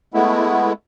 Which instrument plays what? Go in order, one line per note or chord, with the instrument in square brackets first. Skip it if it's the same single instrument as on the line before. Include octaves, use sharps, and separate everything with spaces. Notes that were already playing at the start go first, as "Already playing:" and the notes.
[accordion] G#3 A3 B3 E4